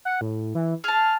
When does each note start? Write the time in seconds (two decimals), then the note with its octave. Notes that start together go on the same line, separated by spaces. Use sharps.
0.05 F#5
0.21 A2
0.55 E3
0.84 G#4 A5 F6